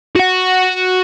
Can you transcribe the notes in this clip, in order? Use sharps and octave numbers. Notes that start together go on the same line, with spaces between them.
F#4 F#5